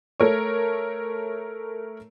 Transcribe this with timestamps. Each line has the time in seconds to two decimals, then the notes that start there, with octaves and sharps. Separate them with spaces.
0.20 A3 A#4 C#5